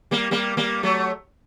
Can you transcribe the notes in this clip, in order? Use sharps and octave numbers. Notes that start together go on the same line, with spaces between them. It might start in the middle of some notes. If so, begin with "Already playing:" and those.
G3 A#3
G3 A#3
G3 A#3
F#3 A3